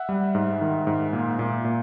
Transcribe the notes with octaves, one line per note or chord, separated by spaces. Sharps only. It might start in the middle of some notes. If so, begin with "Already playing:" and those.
Already playing: E5 F#5
G3
G#2
D#3
G#2
A#2
A#2
A#2